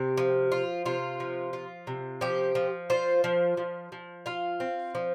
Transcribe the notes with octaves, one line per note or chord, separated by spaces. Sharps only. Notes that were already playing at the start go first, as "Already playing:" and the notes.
Already playing: C3 C4 G4
F3
F4
C3 F4
F3
F4
C3
F3 G4
F3
F4 C5
F3
F3
F3
F4 F5
C4
F3